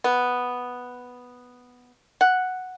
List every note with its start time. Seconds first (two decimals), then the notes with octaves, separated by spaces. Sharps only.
0.04 B3
2.21 F#5